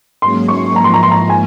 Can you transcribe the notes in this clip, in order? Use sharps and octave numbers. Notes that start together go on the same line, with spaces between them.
G#2 F#3 A#3 C#4 G#4 C6
C#6
G#2 F3 A#3 A#5
C6
A#5
C6
A#5
G#5